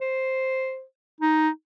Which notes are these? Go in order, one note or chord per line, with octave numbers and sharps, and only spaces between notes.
C5
D#4